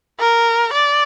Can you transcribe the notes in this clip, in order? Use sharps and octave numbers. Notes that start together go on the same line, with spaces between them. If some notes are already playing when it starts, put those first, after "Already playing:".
A#4
D5